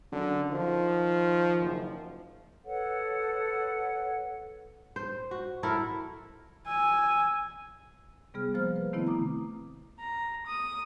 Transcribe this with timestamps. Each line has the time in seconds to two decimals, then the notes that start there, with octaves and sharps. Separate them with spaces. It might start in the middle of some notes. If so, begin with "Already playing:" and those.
0.12 F#2 D3
0.50 D#3 F3
1.61 F#1
2.65 A4 B4 C#5 F#5
4.96 C5
5.31 F#4
5.63 E4 A4 A#4
6.67 G#5 E6
8.34 C3 G3 B3 G#4 F6
8.54 F3 A#3 C5 F6
8.76 B4
8.93 C3 D#3 A3 B3 C4 E4
9.07 A#5 D6 D#6
9.99 A#5
10.46 D#6